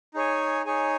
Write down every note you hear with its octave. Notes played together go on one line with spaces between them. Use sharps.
D#4 G#4 C#5 G#5
D#4 G#4 C#5 G#5